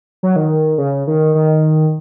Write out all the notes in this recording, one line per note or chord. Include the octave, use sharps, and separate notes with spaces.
F#3
D#3
C#3
D#3
D#3